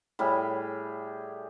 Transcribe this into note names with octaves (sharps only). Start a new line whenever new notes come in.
A2 G3 G#4